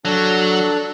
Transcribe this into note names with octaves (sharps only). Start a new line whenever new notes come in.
F#3 D4 A4